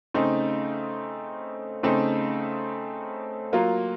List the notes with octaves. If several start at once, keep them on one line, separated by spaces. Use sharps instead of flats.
C#3 A3 C4 D#4
C#3 A3 C4 D#4 A4
F#3 A#3 F4